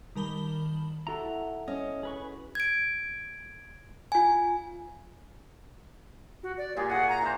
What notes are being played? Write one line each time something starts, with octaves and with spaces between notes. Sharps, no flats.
D#3 G3 A#4 A5 B5 G7
E4 F#4 A4 A#5
C#4 D#5
G#4 B4 C#6
G#6 D7
F4 G#5
F#4
D5
A#2 G4 G#4
F#4 G#4 F#5
A#5
E3 C5